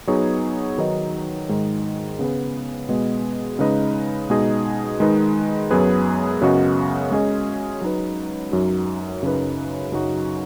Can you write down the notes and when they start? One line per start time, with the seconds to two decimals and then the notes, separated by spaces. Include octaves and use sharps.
0.07 F#3 B3 D#4 G#4 C#5
0.78 D#3 F#3 D#4 B4 D#5
1.49 G#2 D#3 G#3 D#4
2.19 C#3 B3 G#4 B4
2.89 B2 G#3 B3 G#4 D#5
3.59 C#3 G#3 D#4 B4 D#5
4.30 B2 G#3 D#4 G#4 D#5
5.00 D#3 G#3 D#4 B4 D#5
5.71 F#2 F#3 B3 G#4 B4
6.41 F#2 C#3 B3 F#4 D#5
7.11 G#3 C#4 G#4 D#5
7.81 F#3 D#4 B4
8.52 F#2 F#3 D#4 F#4
9.22 F#2 C#3 F#3 D#4 B4
9.92 F#2 C#3 F#3 D#4 F#4